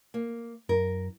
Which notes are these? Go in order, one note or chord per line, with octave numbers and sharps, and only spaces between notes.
A#3
F#2 A#4